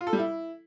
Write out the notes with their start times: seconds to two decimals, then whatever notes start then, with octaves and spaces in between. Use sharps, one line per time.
0.01 F4
0.07 A4
0.13 G3
0.19 E4